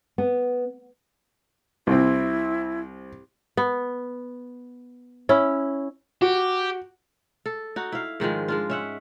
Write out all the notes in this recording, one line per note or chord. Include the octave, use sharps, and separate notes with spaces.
B3
C2 C4 E4
B3
C#4 E4
F#4 G4
A4
D#4 F#4
E4 F5
G#2 D#3 F3 G#3
G#3 D4 F4
C#4 E5 F#5